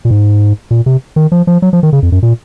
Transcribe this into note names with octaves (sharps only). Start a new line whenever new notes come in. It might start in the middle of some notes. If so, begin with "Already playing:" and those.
A#2
G#2
A#2
C3
D#3
F3
F3
F#3
F3
D#3
C#3
F2
F#2
A#2